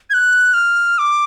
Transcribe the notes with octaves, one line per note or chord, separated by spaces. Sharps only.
G#6
F#6
F6
D6